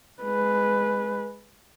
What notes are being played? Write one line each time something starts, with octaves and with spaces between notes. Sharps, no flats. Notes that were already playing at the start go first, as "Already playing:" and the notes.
G#3 B4